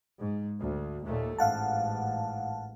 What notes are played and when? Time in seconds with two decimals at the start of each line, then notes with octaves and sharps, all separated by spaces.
0.20 G#2
0.59 D2
1.04 D#2 A#2 A3
1.38 A1 G#2 F5 F#5 A5